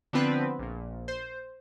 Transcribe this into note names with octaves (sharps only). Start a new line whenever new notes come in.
D3 F3 B3 C4 B4
A#1 A#2
C5